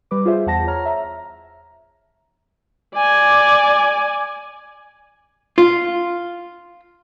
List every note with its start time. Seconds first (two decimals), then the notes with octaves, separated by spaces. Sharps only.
0.11 G3 B4 D6
0.25 F4 G#4 C5 E5
0.46 E2 F#5 A5 A#6
0.67 C#5 A#5 F6
0.85 E5 A#5
2.96 D5 G#5
5.58 F4